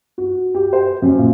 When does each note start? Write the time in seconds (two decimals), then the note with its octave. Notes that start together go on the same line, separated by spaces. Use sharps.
0.18 F#4
0.55 G4
0.73 C5
1.02 F#2
1.18 A#2